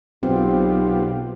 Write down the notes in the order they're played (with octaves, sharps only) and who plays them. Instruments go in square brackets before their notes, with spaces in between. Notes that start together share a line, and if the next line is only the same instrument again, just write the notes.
[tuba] B1 [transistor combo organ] B3 F4 G4 [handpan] C4